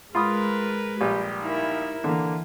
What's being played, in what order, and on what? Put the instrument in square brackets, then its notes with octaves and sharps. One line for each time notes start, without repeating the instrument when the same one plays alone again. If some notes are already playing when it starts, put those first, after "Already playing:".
[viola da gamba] G#3 A#4 B4 [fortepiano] F4 B5 D#6
[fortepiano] A#1 G3 [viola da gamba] G4
[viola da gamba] D#4 E4 A#4
[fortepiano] D3 A#3 [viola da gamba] E3